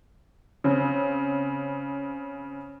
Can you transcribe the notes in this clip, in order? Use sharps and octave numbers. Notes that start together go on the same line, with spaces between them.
C#3 C4